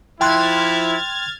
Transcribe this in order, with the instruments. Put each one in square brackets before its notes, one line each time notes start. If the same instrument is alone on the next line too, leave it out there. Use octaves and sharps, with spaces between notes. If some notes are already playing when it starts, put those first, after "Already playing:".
[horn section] F3 E4 [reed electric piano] G5 C6 F#6 [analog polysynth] F6 G#6 A6